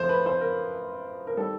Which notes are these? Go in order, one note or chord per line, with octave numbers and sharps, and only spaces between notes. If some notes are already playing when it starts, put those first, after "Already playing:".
Already playing: F#2 F3 A3 C5
B4
C5
A#4
A#4
D#3 G3 A4